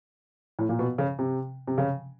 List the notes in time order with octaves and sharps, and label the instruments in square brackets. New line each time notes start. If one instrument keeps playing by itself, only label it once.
[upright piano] A2
A#2
B2
C#3
C3
C3
C#3